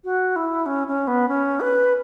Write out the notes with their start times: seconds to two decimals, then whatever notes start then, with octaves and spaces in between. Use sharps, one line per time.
0.04 F#4
0.36 E4
0.66 C#4
0.88 C#4
1.07 B3
1.28 C#4
1.60 B4